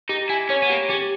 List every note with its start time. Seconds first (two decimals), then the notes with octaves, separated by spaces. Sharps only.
0.09 D#4 G4
0.29 E4 G#5
0.49 C#4 C#5
0.62 B3
0.70 A#3 G4
0.89 C#4 G4